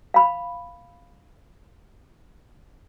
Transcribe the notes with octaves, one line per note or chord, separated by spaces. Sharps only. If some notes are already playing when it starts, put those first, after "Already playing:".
F5 B5